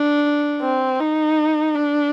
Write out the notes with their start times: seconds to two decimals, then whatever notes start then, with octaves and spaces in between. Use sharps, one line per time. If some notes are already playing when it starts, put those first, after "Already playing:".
Already playing: D4
0.61 C4
1.00 D#4
1.75 D4